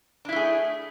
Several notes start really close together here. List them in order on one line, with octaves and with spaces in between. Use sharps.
D4 E4 A3 G#4